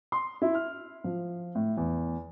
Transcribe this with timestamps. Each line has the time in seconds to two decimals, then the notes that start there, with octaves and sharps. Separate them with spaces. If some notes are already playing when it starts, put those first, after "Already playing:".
0.12 C6
0.42 E4
0.55 F6
1.04 F3
1.55 A2
1.77 E2